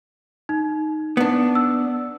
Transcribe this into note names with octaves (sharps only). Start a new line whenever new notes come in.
D#4
B3 D4
E6